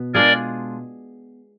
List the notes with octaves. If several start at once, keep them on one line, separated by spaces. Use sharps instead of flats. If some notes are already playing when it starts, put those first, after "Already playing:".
Already playing: B2 B3
G#3 D4 F4 G#4 A#4 D5